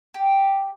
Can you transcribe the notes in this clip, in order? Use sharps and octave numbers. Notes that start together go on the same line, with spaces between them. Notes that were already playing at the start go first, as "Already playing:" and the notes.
G4